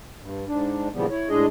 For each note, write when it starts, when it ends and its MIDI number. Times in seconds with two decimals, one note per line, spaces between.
0.21 0.45 43
0.47 0.88 44
0.47 0.88 62
0.94 1.06 46
0.94 1.06 49
0.94 1.06 52
0.94 1.06 53
0.94 1.06 55
0.94 1.06 59
1.10 1.29 64
1.10 1.29 73
1.29 1.46 45
1.29 1.46 56
1.29 1.46 62
1.29 1.46 68
1.29 1.46 75